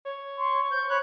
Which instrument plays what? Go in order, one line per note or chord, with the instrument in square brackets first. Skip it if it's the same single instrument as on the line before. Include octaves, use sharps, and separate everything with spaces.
[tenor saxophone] C#5
[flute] C6 [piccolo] C#6
[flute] C5 [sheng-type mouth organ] G6
[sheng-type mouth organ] C#5 F#6 [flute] B5